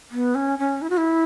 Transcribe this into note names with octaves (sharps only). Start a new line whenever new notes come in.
B3
C#4
C#4
E4
F#4
E4